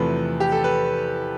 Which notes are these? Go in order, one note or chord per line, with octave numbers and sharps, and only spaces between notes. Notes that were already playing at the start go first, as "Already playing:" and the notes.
Already playing: E2 C3 F3 A3 B4
G4
A4
B4